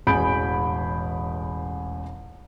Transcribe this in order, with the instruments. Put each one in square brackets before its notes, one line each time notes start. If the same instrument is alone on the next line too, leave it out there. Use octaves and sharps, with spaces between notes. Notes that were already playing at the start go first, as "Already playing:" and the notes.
[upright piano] E1 A1 G#4 B5 G6 D7